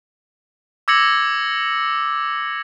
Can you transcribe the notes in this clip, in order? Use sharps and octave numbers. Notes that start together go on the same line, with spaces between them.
D6 E6 G#6 A#6 C#7 F#7